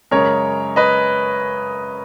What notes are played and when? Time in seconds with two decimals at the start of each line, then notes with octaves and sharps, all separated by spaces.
0.11 F#2 C#3 G#3 A#4 C#5
0.76 B4 D#5